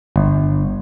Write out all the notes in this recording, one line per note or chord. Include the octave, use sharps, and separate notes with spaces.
G1